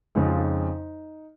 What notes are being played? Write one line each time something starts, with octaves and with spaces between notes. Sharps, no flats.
F2 C#3 G#3 D#4
F4
D#4